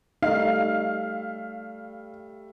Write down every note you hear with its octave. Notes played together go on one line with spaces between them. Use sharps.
G3 A3 D#4 F5